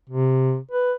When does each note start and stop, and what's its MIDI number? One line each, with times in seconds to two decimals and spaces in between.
0.10 0.57 48
0.71 0.93 71